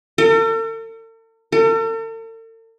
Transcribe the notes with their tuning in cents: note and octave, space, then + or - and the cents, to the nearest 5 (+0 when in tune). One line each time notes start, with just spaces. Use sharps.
A4 +45
A4 +45